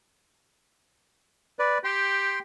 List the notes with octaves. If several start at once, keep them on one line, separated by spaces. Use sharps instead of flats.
B4 D5
G4 G5 C6